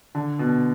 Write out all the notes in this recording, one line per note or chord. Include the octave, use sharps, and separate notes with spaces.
D3
B2